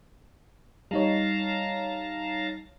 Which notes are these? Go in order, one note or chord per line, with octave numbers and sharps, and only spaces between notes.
G3 D#4 C#5 F5 A5 A#5